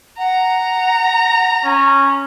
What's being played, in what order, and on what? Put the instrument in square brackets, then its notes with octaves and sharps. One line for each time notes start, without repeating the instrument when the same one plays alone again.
[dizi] F#5 [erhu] A#5
[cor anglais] C#4